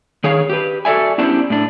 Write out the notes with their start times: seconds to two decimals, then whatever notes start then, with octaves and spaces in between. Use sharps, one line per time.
0.24 D#3 G#4 C#5 F5
0.50 G4 B4
0.85 F#4 A4 D5 E5 G#5
1.18 B3 C#4 D4 E4 G4 C5
1.50 A2 D4